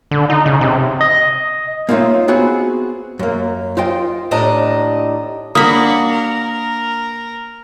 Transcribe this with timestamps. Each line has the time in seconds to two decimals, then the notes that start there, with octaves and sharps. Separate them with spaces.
0.11 D3
0.30 D#4
0.46 C#3
0.61 C3
1.01 D#5
1.89 A#3 B3 D#4 F4 C#5 E5
2.28 B3 C4 F#4 G#4
3.19 F#2 A#3
3.77 F4 C5 D#5 G5
4.31 D#2 A2 D4 D#5 A#5
5.55 A#3 D4 F#4 B5 D#6
6.11 A#4